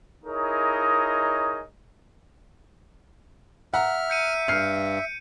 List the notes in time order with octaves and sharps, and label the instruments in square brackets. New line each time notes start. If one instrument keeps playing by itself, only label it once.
[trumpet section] D#4 E4 G#4 A#4 C#5 D#5
[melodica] E5 [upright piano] F#5 A#5 [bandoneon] F6
[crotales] G6 C#7 D#7
[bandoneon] G2 [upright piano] F6 C7